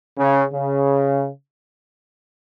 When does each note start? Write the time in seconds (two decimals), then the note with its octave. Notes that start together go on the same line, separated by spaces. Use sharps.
0.18 C#3
0.53 C#3